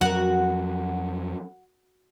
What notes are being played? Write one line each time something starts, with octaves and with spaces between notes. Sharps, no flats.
F2 F#3 F#4 A#4 F#5